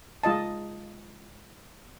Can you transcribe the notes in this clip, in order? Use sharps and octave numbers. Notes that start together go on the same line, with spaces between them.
G#3 F4 D#5 A5